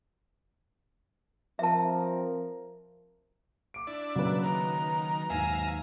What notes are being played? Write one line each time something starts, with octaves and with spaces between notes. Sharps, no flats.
F3 C4 A#4 E5 A5
D6 D7
D4 E4 D5
C#3 F#3 A#3 B4
D#3 A#5
D#2 G#2 E5 F5 G#5 A#5